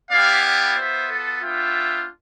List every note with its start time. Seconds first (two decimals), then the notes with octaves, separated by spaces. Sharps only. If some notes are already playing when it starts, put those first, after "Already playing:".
0.11 B3 E4 G4 D5 F5
0.44 D5 F5
0.76 B3 F4 C5 E5
1.10 A4
1.42 B3 D4 F4 E5 G5